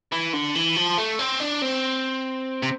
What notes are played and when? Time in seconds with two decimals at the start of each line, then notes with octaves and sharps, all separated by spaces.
0.12 E3
0.33 D3
0.55 E3
0.76 F3
0.98 A3
1.19 C4
1.40 D4
1.62 C4
2.62 C3